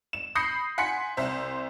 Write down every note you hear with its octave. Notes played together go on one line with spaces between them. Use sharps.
E7
B5 D#6 G6 A#6 C7 C#7
F#5 G#5 C6 B6 C#7
C2 C5 E5